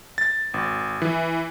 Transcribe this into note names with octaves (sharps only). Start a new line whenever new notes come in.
A6
G#1
E3